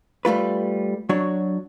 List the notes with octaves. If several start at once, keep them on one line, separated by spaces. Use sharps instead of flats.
G3 A3 F4 B4
F#3 D4 F#4 C#5